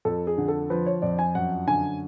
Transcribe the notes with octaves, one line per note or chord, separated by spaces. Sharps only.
F2 A4
G#4
D3
A4
F3 B4
C#5
F2 D5
G#5
F#2 F#5
D3 G#5